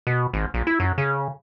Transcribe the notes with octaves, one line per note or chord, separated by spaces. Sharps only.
B2
G#1
A#1
E4
F#2
C#3